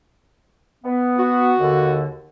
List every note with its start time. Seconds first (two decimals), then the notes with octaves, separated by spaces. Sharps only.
0.84 B3
1.19 F#4
1.59 D#2 D3